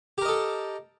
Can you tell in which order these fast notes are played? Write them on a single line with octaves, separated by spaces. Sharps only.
G4 A#4 D#5 A4